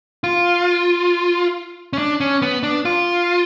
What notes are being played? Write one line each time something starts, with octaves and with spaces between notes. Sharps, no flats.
F4
C#4
D4
C#4
B3
D4
F4